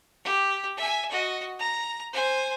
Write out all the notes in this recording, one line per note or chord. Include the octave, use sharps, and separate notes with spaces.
G4
E5 G#5
F#4 D#5
A#5
C5 G#5